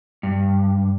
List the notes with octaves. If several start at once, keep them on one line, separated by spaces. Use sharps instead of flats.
G2